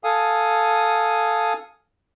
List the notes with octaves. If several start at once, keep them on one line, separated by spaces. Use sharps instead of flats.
A4 F5 G#5 D#6